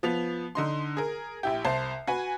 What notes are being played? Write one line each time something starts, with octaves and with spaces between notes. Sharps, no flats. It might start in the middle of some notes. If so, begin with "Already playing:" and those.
F3 B3 F7
D3 D#4 C6
G#4 A#4
A#1 E4 G4
C2 C5 A5 C7
F#4 B4 G#5